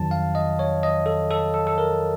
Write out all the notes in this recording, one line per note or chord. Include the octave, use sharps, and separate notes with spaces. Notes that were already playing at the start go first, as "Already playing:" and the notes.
Already playing: F2 D#3 F#3 A5
F5
D#5
C#5
D#5
A4
A4
A4
A4
A#4